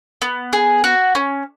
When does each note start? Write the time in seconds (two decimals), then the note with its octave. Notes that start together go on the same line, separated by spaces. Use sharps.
0.22 B3
0.53 G#4
0.84 F#4
1.15 C#4